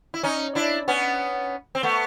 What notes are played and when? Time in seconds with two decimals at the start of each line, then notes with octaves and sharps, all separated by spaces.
0.14 E4
0.23 C#4 D#4
0.55 D4 E4
0.88 B3 C#4
1.75 C4
1.83 A3 B3